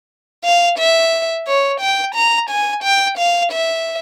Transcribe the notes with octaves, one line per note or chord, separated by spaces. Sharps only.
F5
E5
C#5
G5
A#5
G#5
G5
F5
E5